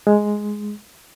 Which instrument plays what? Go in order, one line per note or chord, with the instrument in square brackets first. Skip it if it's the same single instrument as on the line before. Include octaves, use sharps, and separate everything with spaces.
[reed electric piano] G#3